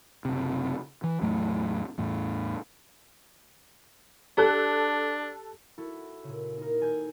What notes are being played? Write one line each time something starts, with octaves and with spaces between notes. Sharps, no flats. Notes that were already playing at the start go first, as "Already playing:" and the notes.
F#1 C3
E3
E2 A2 F#3 A3
E2 A2
D4 G4 A4 F#6
E4 F#4 A4
A#2 C#3
D#4 A#4
D#1 A4 G#5 G6